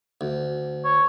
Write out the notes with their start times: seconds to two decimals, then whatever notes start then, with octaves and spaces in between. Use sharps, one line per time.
0.21 D2
0.85 C#5